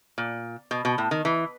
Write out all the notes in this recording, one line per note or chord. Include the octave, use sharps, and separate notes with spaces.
A#2
B2
B2
A2
D#3
E3